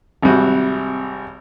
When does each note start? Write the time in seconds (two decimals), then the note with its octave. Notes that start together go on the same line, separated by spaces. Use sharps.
0.22 G#1 C3 G3 F#4